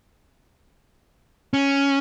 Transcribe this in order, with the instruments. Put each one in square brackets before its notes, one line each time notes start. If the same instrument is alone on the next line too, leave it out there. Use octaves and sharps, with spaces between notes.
[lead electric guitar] C#4